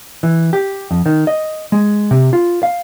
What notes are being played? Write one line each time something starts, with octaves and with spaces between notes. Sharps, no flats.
E3
G4
F2
D#3
D#5
G#3
C3
F4
F5